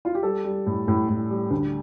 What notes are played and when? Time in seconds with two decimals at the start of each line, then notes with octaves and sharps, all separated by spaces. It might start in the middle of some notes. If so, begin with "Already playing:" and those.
0.05 F4
0.15 G4
0.23 G3 A4
0.44 G3
0.67 A2
0.88 A2
1.09 A2
1.30 G3
1.51 D2